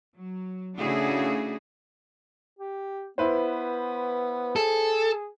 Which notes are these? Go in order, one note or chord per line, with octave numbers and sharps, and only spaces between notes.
F#3
C#3 A3 D4 E4 F#4 G#4
G4
B3 E4 B4 C5
G#4 A4